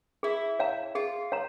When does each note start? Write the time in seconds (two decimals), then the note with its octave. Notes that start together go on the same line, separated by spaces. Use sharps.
0.23 E4 G#4
0.59 C#5 F5 A#5
0.95 F4 G#4
1.32 C#5 F5 A#5